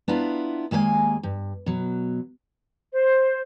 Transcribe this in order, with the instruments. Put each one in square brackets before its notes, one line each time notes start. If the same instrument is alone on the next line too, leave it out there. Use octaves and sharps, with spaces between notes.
[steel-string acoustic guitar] B3 D4 E4 F4 A#5
D#2 G#3 A#3 C#5 G#5
G2
B2 F#3
[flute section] C5